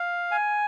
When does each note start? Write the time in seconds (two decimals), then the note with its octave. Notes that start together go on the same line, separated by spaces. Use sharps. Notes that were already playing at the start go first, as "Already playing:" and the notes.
Already playing: F5
0.31 G#5